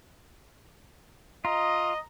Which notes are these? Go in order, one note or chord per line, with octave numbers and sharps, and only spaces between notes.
F4 D#5 A#5